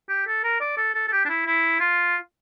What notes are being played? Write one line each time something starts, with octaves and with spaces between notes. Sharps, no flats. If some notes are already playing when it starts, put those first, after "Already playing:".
G4
A4
A#4
D5
A4
A4
A4
G4
D4
E4
E4
F4